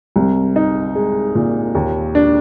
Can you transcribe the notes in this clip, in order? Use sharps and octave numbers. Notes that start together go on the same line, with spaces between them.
C2
D#4
G#3
A#2
D#2
D4